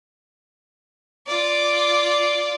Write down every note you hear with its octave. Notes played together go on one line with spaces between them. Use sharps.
F4 D5